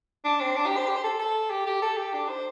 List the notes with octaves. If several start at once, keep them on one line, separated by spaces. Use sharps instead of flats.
D4
C4
D4
G4
C5
G4
C5
A4
A4
G4
G4
A4
G4
D4
C5